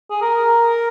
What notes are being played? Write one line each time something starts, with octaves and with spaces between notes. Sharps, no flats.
G#4
A#4